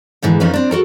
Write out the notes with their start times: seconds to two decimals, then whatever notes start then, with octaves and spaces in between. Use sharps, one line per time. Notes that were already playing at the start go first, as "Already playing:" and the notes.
0.22 E2 G#2 D3 E3
0.40 F2 F3 C#4 D#4 B4
0.54 C4 D4
0.71 F#4 A4 A#4